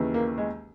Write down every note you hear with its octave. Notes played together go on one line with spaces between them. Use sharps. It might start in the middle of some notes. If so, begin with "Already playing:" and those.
Already playing: D#2 C#3 E3
A#3
G#3